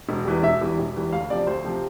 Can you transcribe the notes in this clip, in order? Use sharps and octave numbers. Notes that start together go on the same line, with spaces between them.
E1
E2 E3 G3
E1 E5
E2 E3 G3
E1
E2 E3 G3
D2 F5
C3 F3 D5
D2 C5
C3 F3